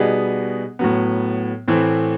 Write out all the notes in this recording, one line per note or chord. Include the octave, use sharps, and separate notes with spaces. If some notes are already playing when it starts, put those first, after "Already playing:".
Already playing: B2 G3 B3 D#4 G#4
A2 F#3 B3
A2 E3 A3 C4